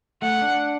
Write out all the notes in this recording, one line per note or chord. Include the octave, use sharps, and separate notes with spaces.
A3 F#5
D4